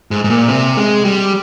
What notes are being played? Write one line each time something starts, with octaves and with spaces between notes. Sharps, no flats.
G#2
G#2
A#2
C3
G#3
G3